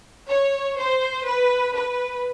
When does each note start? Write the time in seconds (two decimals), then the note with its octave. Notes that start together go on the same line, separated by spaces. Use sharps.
0.29 C#5
0.78 C5
1.25 B4
1.75 B4